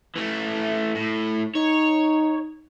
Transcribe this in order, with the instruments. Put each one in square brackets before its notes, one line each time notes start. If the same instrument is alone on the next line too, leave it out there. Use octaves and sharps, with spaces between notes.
[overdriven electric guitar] E3 A3
A2
[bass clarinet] D#4 [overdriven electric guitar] C#5